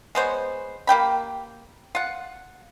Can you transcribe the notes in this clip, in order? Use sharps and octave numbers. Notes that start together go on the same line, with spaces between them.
G#3 B3 C5 C#5
A#3 G4 G5 B5
F4 F#5